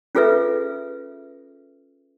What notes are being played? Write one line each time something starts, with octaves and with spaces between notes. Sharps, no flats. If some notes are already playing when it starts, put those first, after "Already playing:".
C#4 F4 G#4 A4 B4 E5